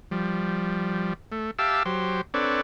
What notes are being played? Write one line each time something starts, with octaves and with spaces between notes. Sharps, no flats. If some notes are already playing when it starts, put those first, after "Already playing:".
F3 G3
A3
G4 E5 F5 A5 D6 E6
F#3 G4 C5
C4 D4 A4 B4 C#5 D5